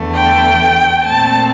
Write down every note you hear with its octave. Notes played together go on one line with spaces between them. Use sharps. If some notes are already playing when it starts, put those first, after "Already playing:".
Already playing: E2 D3 A3
G5
A#2 A3 C4 A5